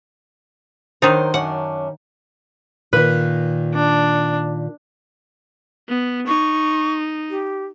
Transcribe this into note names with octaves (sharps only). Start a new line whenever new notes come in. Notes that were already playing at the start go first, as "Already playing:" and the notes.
D#3 F#3 D4 D#4 A#4 C5
F#2 C#4 D4 F#5
A#2 D#3 B4
D4
B3
D#4 C#6
G4